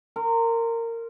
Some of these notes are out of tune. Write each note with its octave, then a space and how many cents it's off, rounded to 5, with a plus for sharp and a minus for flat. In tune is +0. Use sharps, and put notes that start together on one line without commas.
A#4 -20 C6 +0